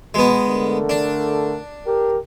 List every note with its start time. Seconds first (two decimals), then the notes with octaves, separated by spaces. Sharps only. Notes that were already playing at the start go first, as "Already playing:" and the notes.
0.14 B2 G#3 B3
0.47 D3 A3 A#4
0.89 D4
1.86 G4 A#4